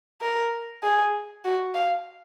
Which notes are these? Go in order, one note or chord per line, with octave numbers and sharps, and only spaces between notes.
A#4
G#4
F#4
F5